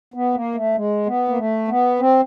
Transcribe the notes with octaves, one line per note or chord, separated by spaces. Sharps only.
B3
A#3
A3
G#3
B3
A#3
A3
B3
C4